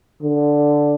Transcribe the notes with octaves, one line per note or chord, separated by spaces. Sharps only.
D3